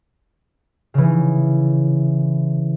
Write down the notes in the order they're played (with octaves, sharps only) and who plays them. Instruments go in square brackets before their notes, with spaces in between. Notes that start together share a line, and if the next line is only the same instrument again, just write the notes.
[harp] C#3 E3